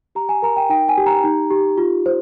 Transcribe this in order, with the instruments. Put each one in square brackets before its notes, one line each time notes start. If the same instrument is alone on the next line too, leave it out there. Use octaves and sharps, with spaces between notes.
[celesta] G4 A#5
G#5
A#4 A#5
G5
D#4 G5
G#5
G4
A#5
D#4
G4
F4
C5